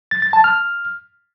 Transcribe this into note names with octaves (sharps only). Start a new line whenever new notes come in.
A6
A6
A5
F6